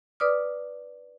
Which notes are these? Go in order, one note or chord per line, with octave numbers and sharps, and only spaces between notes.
B4 D5 D6 D#6 F6